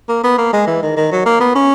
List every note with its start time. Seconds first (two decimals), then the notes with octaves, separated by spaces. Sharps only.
0.09 A#3
0.24 B3
0.38 A#3
0.53 G#3
0.67 E3
0.83 D#3
0.97 D#3
1.12 F#3
1.26 A#3
1.40 B3
1.55 C#4